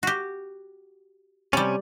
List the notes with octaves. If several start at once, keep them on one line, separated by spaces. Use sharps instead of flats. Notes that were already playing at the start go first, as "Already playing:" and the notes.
F#4 G4
C3 G3 C#4 D5